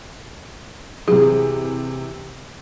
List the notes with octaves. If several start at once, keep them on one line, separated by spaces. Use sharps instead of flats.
C3 E3 G#4